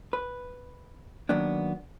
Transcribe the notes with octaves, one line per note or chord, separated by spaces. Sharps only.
B4
D#3 F#3 A#3 B3 D4